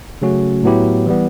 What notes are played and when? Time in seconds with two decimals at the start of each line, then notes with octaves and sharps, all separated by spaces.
0.22 C#3 F#3 A3 C#4 F#4
0.63 A2 F#3 B3 E4 G4
1.06 E3 G3 B3